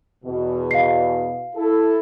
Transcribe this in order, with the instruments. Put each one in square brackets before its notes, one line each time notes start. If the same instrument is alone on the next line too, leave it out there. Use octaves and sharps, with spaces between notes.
[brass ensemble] E2 B2
[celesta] F5 C7
[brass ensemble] E4 A4